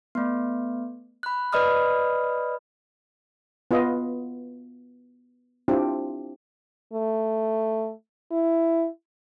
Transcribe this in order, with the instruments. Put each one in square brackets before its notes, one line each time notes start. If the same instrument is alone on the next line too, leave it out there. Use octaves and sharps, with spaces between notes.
[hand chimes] A3 B3
B5 F#6
B4 D5 D#5 B5 D#6 F6
[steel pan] B3 F4 G#4 D#5
C4 D4 E4 F4 G4
[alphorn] A3
E4